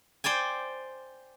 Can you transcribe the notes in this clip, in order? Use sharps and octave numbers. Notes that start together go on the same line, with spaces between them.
C5 D5 G5 G#5